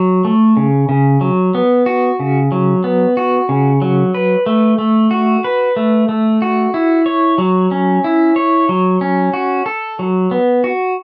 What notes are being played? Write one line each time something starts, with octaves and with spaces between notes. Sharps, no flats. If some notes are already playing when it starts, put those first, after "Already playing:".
Already playing: F#3
A3
C#3
C#3
F#3
B3
F#4
C#3
F#3
B3
F#4
C#3
F#3
B4
A3
A3
F#4
B4
A3
A3
F#4
E4
C#5
F#3
C#4
E4
C#5
F#3
C#4
F#4
A4
F#3
B3
F#4